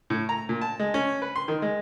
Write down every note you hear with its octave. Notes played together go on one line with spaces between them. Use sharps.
A2
A#5
A#2
A5
G#3
C#4
B4
C6
D#3
G#3